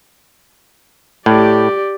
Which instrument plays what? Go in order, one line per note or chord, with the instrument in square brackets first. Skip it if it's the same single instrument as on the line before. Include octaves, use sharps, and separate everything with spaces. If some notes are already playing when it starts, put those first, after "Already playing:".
[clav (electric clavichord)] A2 [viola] G4 D5